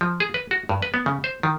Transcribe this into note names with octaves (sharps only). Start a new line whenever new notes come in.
F3
G#4
B4
F#4
G2
B4
B3
C#3
C5
D#3